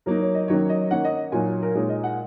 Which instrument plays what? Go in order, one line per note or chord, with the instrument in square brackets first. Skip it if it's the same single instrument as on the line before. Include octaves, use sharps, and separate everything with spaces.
[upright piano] F#3 A#3 D#4 A#4
C#5
D#5
D#3 F#3 A#3 C#4 C#5
D#5
D#3 A#3 C#4 F#5
D#5
A#2 F#3 D#4 G#5
A#4
A#2 G#3 D#4 C#5
D#5
F#5